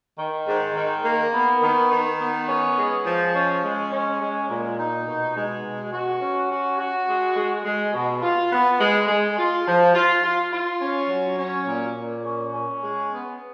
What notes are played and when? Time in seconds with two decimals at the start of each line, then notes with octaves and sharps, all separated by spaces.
0.18 D#3
0.47 G#2
0.75 D#3
1.04 A#3
1.34 B3
1.62 D#3
1.91 D#3
2.20 B3
2.48 C#4
2.77 G#3
3.05 F3
3.34 C#4
3.63 G#3
3.92 C#4
4.20 G#3
4.49 A#2
4.78 D#4
5.07 B2
5.35 G#3
5.64 B2
5.92 F#4
6.21 C#4
6.50 F#4
6.79 F#4
7.07 G#3
7.36 G#3
7.65 G#3
7.94 B2
8.22 F4
8.51 B3
8.79 G#3
9.08 G#3
9.37 F4
9.66 F3
9.94 F4
10.22 F4
10.52 F4
10.80 C#4
11.09 F#3
11.38 C#4
11.66 A#2
11.96 A#2
12.24 C#4
12.53 C#4
12.81 G#3
13.10 B3